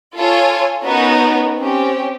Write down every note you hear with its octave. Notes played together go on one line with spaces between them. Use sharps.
F4 A4 C#5 G#5
B3 C#4 D#4 F#4 A#4 B4
C4 C#4 G4